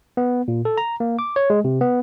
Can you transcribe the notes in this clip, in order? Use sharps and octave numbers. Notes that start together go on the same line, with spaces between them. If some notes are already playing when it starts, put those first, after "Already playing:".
B3
A#2
A4
A#5
A#3
D6
C#5
G#3
C3
B3